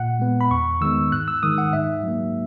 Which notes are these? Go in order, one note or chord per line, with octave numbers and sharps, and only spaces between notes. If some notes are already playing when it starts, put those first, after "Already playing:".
Already playing: A#2 F#5
G#3 B3
B5
E2 C#6
D#3 G#3 B3 E6
G#2 F#6
E6
D#3 G#3 D#6
F#5
G#2 E5
F#3 A#3